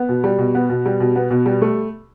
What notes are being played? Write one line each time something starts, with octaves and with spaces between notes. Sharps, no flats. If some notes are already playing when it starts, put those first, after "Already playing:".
Already playing: B3
B2
G3
B2
B3
B2
G3
B2
B3
B2
G3
A3